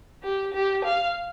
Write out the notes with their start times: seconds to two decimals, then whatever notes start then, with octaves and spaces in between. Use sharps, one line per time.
0.23 G4
0.54 G4
0.85 F5